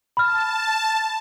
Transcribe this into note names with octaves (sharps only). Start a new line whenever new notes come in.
A5 B5 F6